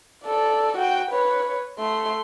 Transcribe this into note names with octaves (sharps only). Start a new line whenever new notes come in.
A4 D5
F#4 G5
B4 C#5
A3 C6